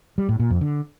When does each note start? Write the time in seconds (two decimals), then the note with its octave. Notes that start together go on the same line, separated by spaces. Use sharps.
0.18 G3
0.29 A2
0.40 A#2
0.50 F2
0.61 D3